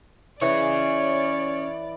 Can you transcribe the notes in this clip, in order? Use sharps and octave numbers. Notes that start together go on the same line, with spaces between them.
E3 C#4 G#4 C#5 D5